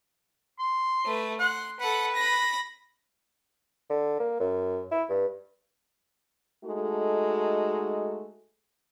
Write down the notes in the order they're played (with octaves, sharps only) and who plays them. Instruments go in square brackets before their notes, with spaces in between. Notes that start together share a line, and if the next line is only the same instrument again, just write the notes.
[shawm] C6
[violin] A3 B4
[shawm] F#5 [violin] C6
[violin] A4 F#5 [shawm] B4
[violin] B5 A#6
[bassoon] D3
A#3
F#2
E4
G2
[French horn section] G#3 A3 D#4 F#4 A4